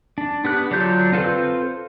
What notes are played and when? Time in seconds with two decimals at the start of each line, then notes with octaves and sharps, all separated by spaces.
0.18 D4
0.45 B3 G4 F#6
0.71 D3 F#3 D4 F4 G6
1.12 C4 F4 A4 B4 C5